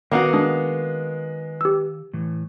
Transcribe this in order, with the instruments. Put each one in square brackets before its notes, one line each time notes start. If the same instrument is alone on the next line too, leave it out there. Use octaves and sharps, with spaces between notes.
[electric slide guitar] D#3 F5 F#5 [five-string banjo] A#3 B3 F#4
[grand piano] G#3 [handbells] D4 D#6
[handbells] G4 E6
[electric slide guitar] A2 E3